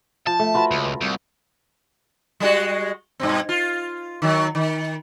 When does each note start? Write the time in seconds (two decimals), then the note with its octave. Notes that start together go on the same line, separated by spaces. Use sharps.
0.27 F3 A5
0.39 A3
0.54 F4 F#4 B4
0.71 C#2
1.01 C2
2.40 G3 G#3 F#4
3.20 G2 B2 C4
3.49 F4
4.22 D#3 F#3
4.55 D#3